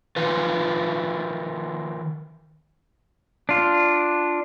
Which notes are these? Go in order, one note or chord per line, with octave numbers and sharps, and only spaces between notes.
D#3 F3 F4 B4
D4 F4